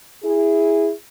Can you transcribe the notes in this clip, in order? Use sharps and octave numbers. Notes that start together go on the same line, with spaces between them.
E4 G#4